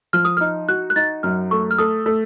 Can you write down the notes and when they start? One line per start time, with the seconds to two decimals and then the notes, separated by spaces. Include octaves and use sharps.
0.13 F3 F6
0.25 D#6
0.37 D#4 F6
0.68 F#4 F#6
0.90 F#6
0.96 D#4 A6
1.23 F#2 F6
1.51 A3 C#6
1.71 F6
1.78 A3 D#6
2.06 A3